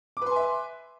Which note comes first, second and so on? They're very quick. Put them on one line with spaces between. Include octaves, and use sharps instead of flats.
D6 B4 C6 G#5 E5